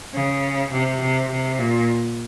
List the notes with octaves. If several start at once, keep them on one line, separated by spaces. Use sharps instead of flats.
C#3
C3
C3
C3
A#2